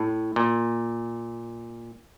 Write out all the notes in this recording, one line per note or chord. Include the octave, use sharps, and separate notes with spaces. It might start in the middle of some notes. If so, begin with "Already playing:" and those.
Already playing: A2
A#2